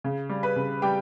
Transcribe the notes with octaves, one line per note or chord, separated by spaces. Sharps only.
C#3
G3
B4 B5
C#3
G3 G4 G5